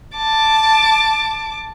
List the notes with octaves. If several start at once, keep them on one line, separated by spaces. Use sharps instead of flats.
A5 D6